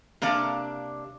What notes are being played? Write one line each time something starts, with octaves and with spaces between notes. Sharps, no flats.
C3 A#3 D4 D5 F5